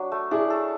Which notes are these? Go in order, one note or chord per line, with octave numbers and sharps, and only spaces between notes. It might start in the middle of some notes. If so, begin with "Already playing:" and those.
Already playing: F#3 D4
A3
D4 E4 G#4
A4